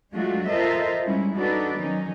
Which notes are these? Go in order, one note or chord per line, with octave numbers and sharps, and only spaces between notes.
F#3 G#3 A3 D4 F4 F#4
F4 A4 A#4 C5 D#5 E5
G3 G#3 C#4 E4
D4 D#4 F#4 A4 B4 D5
D#3 F#3 C#4 D#4